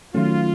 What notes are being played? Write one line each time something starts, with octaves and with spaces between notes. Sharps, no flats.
D#3 F#3 A3 C#4 F4